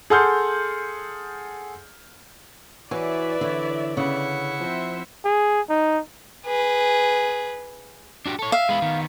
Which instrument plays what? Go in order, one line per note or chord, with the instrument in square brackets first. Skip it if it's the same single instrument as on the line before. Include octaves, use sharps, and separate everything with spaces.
[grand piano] G#4 A4 F#5 C6 F6 G6
[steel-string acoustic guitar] E3 [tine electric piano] F#4 C#5 G#5 [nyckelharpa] B4 [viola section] D5 E5
[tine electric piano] D3 C#5 [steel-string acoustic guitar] E3
[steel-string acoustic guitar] C#3 [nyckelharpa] E4 F#5
[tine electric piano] F3 [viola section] C4 C5 E5
[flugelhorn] G#4
D#4
[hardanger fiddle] G#4 B4
[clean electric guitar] D4 F#4 G4
A4 C#5
[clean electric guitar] E5 [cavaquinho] F5
[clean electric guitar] G#3 B3 E4
D#3 B3